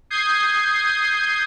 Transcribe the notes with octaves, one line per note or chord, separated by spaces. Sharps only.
D#6 G6 G#6 C7